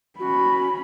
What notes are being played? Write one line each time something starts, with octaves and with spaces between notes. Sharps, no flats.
C#4 F#4 B5